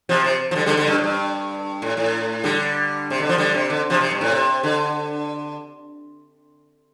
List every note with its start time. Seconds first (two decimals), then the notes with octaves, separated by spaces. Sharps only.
0.09 C3 F3
0.24 C3
0.51 F3
0.56 D3 G3
0.66 D3 G3
0.77 D3 G3
0.87 G2
0.98 A2
1.04 G2
1.82 A2
1.97 A2
2.44 D3 G3
3.10 C3
3.20 D3
3.29 F3
3.38 D3 G3
3.54 C3
3.70 D3
3.90 C3 F3
4.01 C3
4.11 G2
4.21 A2
4.32 C3
4.63 D3